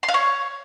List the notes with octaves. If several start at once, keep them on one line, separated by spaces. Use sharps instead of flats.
C6
F5
C#5